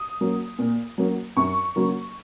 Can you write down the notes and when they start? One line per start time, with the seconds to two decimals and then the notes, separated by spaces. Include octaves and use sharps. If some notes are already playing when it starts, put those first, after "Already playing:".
Already playing: D#6
0.21 F#3 A#3 C#4
0.59 A#2
0.98 F#3 A#3 C#4
1.37 F#2 C#6
1.76 C#3 F#3 A#3